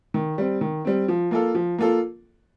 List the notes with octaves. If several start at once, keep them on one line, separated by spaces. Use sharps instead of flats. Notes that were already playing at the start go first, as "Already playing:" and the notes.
D#3
G3 C4
D#3
G3 C4
F3
A#3 F4 A4
F3
A#3 F4 A4